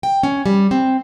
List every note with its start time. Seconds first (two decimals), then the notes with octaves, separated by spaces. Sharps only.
0.03 G5
0.23 C#4
0.46 G3
0.71 C4